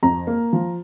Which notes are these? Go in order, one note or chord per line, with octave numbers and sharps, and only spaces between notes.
F2 A#5
A#3
F3